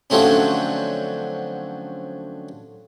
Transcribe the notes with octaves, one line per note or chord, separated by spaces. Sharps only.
D3 F3 F#3 A3 C4 C#4